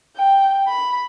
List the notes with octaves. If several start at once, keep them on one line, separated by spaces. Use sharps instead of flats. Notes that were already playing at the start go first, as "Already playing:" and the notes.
G5
B5